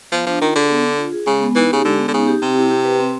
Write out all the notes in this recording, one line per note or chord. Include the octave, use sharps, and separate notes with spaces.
F3 B3
F3 D4
D#3 F4
D3 G#4
B3
D4
F4
G#4
C#3 G#3
B3
E3 D#4
C#3 G4
D3 G#3
B3
D3
C#3 D#4
G4
C3 C4
E4
G4
B4
C4